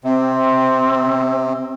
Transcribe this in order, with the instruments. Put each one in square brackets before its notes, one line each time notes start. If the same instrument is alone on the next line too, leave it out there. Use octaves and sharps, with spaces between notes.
[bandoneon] C3 [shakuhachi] C4